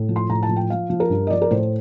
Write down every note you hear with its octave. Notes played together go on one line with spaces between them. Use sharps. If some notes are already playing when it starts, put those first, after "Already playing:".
Already playing: A2
F3
C6
A2 A#5
A5
F3
G5
F3 F5
F3
A#4
G2
D#5
F3 D5
A#4
A2 C5